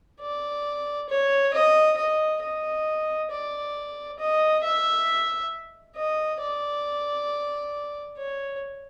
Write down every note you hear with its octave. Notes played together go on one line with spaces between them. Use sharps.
D5
C#5
D#5
D#5
D#5
D5
D#5
E5
D#5
D5
C#5